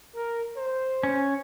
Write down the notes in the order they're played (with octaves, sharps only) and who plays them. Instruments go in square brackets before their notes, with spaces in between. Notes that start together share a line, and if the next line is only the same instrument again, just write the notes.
[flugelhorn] A#4
C5
[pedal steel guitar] C#4